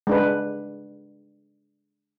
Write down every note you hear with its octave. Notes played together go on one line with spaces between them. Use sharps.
G#3 D4 B4